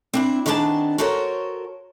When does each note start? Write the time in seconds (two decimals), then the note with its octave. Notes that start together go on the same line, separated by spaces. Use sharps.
0.14 C4 D4 E4
0.46 D#3 B3 C4 D4 G#4 A5
0.98 F#4 A4 A#4 C5 C#5